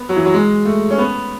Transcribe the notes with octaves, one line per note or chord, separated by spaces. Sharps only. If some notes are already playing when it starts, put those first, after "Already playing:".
Already playing: B3
F#3
E3
F#3
G#3
A3
C#4
B3